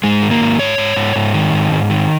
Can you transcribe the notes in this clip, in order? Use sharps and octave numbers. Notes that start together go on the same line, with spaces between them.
G#2 G#3
D#3
A#3
G#2
G#2 C#5
G#2
G#2
G#2
D#3
G#2
G#2
D#3